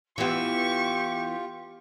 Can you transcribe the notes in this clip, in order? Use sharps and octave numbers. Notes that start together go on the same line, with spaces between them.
E3 B3 F4 G4 C#6